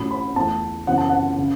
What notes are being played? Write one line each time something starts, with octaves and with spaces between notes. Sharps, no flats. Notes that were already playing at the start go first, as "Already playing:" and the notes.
Already playing: A1 A2 F#3 C#4 B5
B5
E2 E3 A3 A5
F#2 C#3 E3 B3 F#5
A5
F#5
C#3